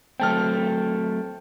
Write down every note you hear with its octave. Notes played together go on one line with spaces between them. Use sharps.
F#3 A3 C4 G5 A5 F6